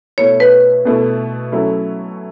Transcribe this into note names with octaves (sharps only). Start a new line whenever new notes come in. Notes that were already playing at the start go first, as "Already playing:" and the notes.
B2 A3 E4 C#5
B4
B2 A3 E4
F#3 A3 C#4 E4